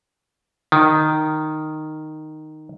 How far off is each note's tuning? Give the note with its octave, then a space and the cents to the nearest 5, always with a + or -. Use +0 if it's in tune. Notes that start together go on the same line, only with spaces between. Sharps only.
D#3 -5